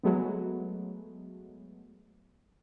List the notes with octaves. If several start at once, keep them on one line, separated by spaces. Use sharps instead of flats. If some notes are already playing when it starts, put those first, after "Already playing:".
F#3 G#3 A3 B3